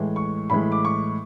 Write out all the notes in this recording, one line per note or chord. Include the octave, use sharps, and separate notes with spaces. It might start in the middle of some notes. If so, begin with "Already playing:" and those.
Already playing: A2 E3 G#3
C#6
A2 E3 G#3 B5
D6
C#6